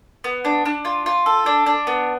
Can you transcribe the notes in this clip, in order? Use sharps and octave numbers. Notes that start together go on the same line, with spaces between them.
B3
D4
D4
F4
F4
A4
D4
D4
B3